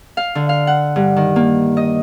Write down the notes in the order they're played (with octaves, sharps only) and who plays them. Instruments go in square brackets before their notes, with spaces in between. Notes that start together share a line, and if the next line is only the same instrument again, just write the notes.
[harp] F5
D3
F5
F#5
G2
D#3
A#3
D#5